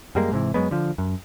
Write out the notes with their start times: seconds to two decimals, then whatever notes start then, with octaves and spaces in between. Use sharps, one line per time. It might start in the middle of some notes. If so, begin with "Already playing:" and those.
0.15 F#2 G3 G#3 A#3
0.32 G#2 C3 E3
0.54 F#2 F#3 G#3 B3
0.71 D3 F3
0.98 F#2